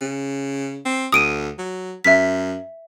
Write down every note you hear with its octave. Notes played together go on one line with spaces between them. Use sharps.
C#3
C4
D2 D#6 D7 D#7
F#3
F#2 E5 B6